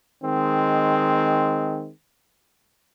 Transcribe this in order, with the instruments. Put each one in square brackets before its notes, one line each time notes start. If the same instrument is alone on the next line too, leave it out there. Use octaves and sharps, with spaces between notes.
[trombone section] D#3 G#3 C4